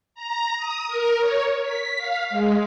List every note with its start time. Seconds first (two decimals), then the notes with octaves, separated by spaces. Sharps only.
0.15 A#5
0.57 D#6
0.87 A#4
1.20 C#5
1.62 B6
1.97 F5
2.30 G#3